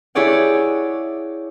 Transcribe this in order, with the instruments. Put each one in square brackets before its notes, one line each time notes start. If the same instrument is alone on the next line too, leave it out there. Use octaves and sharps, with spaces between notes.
[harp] E4 G4 G#4 C#5 D5 F#5